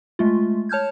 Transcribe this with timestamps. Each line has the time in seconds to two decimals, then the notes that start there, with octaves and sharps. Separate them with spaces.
0.19 G#3 A3 F4
0.69 C#5 A5 F6 G6 G#6